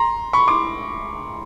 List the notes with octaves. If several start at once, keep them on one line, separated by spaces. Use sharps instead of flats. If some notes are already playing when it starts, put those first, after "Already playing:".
Already playing: A#5 C6
B5 C#6
C6 D6